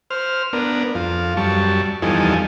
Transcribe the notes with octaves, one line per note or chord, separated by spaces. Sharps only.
C5 F6
B3 D4 A#4
F2 F4
F#2 G3 A5 C#6
E2 F3 G3 D#4 A4 G#5